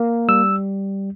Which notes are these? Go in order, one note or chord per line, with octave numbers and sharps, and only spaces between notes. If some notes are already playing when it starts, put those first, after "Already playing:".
Already playing: A#3
G3 E6